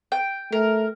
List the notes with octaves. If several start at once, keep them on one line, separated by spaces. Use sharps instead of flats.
G5
A3 A#4